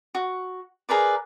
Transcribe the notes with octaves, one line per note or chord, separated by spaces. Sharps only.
F#4
G#4 A#4 B4 D5